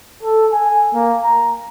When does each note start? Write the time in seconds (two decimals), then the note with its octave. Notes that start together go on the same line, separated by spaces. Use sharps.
0.23 A4
0.52 G#5
0.94 A#3
1.24 A#5